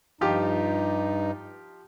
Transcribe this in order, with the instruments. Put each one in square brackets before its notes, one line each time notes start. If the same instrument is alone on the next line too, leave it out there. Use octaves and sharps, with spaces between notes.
[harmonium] G2 D#4 [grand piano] F3 F4 G4